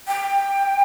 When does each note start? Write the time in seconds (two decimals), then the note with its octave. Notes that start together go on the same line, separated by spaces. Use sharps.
0.08 G5